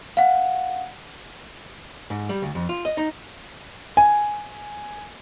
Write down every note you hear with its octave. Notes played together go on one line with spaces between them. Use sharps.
F5 F#5
G#2
G3
D2
F2
F4
D#5
D#4
G#5